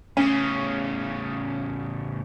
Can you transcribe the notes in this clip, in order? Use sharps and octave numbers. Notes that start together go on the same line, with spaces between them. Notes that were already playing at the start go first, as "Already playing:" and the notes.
A2 C#3 C#4